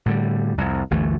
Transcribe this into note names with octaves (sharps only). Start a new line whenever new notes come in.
A2 D3 G3
C2 F2
G1 D2 E3 A3